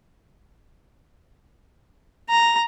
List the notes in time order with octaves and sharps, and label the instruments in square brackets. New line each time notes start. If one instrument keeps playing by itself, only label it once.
[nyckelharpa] A#5